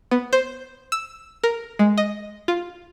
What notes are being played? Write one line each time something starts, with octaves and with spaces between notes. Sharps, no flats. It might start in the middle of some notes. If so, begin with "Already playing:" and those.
B3
C5
E6
A#4
G#3
D#5
F4